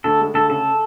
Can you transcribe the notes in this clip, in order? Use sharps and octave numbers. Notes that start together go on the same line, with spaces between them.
D2 A4
G#3
D2 A4
C#3 A4